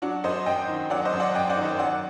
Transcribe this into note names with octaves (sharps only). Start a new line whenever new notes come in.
F#3 D4 F#4
F#2 C5 D#5
F#2 D#5 G5
D#3
F#3 D5 F#5
C5 D#5
F#2
D5 F#5
F#2 D#5 G5
D5 F#5
D#3
C5 D#5
F#3 D5 F#5